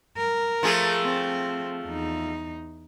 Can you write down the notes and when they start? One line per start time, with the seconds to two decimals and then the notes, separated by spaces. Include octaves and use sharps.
0.18 A#4
0.63 F3 A3 G#4
1.02 C4
1.85 E2 D#4